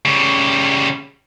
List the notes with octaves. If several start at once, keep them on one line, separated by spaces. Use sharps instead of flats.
C#3 G3